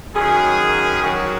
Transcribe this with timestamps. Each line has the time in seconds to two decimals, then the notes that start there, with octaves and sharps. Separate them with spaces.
0.15 F#2 D#3 F#3 G#4
1.02 F#2 D#3 F#3 F#4